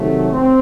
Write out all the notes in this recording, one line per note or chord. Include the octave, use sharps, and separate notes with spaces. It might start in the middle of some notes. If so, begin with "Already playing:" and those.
Already playing: C3 D#3 F#3 A3
C4